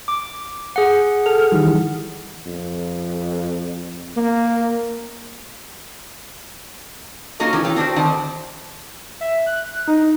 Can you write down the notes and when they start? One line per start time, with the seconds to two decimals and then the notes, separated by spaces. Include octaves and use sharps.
0.08 D6
0.76 G#4 F#5
1.26 A4 F6
1.52 D#3 E3 G3
2.46 F2
4.17 A#3
7.40 A#3 C#4 F4 F#4 A4 D#5
7.53 C3 E3 C#4 E4 G4
7.65 F4 A4 C#5 G5
7.76 C4 D4 F#4 C5
7.96 D3 D#3 C5 D5 A5
9.21 E5
9.46 F#6
9.88 D#4